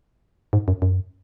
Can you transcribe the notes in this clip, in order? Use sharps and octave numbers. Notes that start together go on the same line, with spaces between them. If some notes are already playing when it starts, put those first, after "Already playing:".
G#2
F#2
F#2